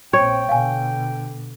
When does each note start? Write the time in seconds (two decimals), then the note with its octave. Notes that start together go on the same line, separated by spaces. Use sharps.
0.13 A#1 C4 C#5 G5
0.49 B2 D3 F5 G#5